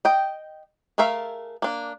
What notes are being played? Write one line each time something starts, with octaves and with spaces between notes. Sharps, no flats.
D#5 G5
A3 G#4 A#4 E5 F5
A#3 D4